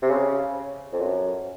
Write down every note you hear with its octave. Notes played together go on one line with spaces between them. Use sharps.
C3
C#3
F2
F#2